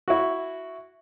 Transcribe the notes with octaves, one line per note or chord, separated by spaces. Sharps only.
E4 F#4